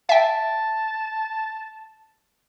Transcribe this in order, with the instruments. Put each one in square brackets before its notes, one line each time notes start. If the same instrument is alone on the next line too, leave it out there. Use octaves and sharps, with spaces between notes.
[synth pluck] E5 G5 [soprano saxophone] A5